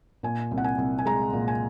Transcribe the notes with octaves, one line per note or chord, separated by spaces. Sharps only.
A#2 G#5
C2
F#5
G#5
C2
G#5
G#3 A#5
A#2
G#5